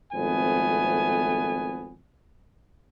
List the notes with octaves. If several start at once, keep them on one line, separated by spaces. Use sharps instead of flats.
G#1 F2 A3 B3 G#5